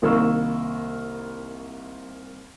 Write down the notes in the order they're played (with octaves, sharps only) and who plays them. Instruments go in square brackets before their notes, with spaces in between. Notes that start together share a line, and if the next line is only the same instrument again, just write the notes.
[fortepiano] C2 D#3 A#3 C#6 E6